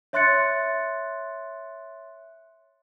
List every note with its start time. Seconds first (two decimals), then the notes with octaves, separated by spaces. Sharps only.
0.13 C#5 E5 C6 F#6 A6 C#7